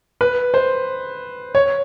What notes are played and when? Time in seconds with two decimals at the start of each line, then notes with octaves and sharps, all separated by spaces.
0.21 B4
0.54 C5
1.55 C#5